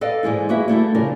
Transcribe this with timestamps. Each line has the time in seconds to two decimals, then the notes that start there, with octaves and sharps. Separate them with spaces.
0.01 A4 B4 D5 D#5 F5
0.23 G#2 E3 G#3 E4
0.49 A#3 E4 F#4 G#4 B4 E5
0.68 G3 A3 E4 A4
0.95 C#3 F3 D4 A#4